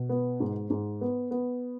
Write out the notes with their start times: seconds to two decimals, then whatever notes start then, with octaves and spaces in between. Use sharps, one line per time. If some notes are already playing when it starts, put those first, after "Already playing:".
Already playing: B2
0.09 B3
0.40 G#2
0.70 G#2
1.01 B3
1.31 B3